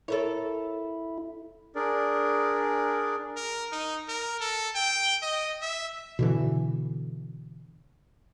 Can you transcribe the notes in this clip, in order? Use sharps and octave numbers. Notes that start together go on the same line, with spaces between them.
E4 A4 A#4 C#5
D4 G#4 A#4 D5
A#4
D#4
A#4
A4
G5
D#5
E5
B2 D3 E3